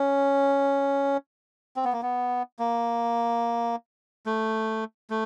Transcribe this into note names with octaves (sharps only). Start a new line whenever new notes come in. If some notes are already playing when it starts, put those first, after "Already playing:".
Already playing: C#4
C4
B3
A#3
B3
A#3
A3
A3